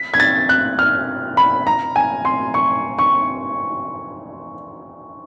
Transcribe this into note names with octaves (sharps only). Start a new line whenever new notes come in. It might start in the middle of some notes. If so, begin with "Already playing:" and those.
Already playing: B6
G#6
A6
F#6
F6
B5
A#5
G#5
C6
C#6
C#6